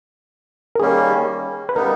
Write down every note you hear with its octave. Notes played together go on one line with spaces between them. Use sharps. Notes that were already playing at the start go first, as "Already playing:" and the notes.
A#4
D#3 G3 A#3 C#4 G#4
B4
C#3 G3 B3 D#4 A#4